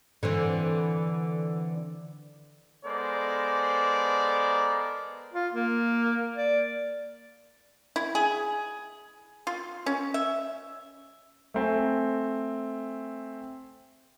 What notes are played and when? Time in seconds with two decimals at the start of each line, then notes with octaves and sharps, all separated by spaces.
0.23 D3 E3 C4
2.85 G#3 B3 A4 A#4 C5 D5
5.33 F4
5.54 A#3
6.36 D5
7.96 E4
8.15 G#4
9.47 F4
9.86 C#4
10.14 E5
11.54 A3 C4 G#5